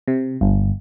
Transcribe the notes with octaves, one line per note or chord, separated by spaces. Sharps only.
C3
G1